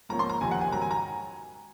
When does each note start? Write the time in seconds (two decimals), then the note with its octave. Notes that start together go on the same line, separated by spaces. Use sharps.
0.09 G#2 F3 A#3 C#4 A#5
0.19 C6
0.30 A#5
0.41 F#1 F2 C3 D#3 G#5
0.51 F#5
0.61 G#5
0.72 G#2 D#3 F#3 A#5
0.82 G#5
0.91 A#5